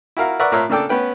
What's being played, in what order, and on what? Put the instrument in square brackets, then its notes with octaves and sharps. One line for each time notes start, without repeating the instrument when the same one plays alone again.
[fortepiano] E4 F#4 A#4 F5
A#4 B4 D5 E5 F#5 C#6
A2 F4 A#4 C#5 E5 F#6
C#3 A#3 D4 A4 G5 D6
B3 C#4 B4 G5